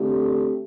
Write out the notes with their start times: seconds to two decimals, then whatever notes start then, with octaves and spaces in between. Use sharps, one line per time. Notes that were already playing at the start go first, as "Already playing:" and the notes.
Already playing: D3 A3 C4 G4